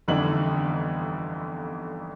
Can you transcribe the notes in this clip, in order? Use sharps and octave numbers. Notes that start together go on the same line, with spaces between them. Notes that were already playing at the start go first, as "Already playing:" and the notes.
G1 F2 D3 E3 D#4 F#7